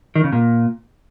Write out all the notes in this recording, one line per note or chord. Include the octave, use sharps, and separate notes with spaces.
D#3
C#3
A#2